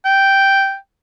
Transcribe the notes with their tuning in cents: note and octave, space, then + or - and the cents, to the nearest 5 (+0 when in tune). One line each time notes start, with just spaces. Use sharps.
G5 -5